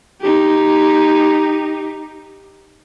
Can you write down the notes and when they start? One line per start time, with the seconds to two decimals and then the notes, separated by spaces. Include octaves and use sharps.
0.21 D#4 G4